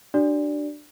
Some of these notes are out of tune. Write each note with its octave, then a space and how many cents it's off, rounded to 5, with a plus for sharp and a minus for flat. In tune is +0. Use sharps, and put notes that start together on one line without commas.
D4 +15 F#4 +45 D5 -5